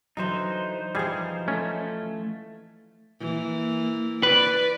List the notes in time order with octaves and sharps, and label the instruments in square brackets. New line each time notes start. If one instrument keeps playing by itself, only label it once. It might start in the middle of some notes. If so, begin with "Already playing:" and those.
[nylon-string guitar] D3 E3 F#3 [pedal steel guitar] D#4 C5
[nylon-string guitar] E3 F3 [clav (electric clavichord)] G3 G#4
[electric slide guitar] A3 [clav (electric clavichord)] C#4
[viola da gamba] E3 A#3
[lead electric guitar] B4 [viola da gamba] D5